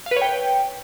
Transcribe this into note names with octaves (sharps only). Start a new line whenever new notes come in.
F5
B4
C#5
G5